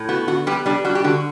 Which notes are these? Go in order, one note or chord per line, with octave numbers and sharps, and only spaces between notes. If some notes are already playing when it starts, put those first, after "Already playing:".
Already playing: A2
B3 F#4
D3 F#4
G3 B3 G4
G3 D4 G4
G3 F#4
G4
D3 F#4